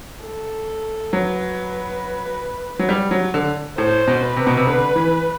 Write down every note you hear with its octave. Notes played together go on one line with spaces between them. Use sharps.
A4
F#3 B4
F#3
G3
F#3
D3
A2 C5
B2
B4
C3
B2
C3
D3
E3